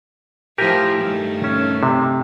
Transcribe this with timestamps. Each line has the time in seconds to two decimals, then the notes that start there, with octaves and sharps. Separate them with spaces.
0.58 A2 F3 E4 G4 A#4 G#5
1.00 G2 D#3 A3
1.44 C#4
1.83 C3